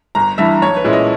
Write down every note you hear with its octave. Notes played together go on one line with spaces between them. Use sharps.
G1 A#5
G2 E3 E5
B1 C#5
B4
A#2 G#3 C#4 E4
D#5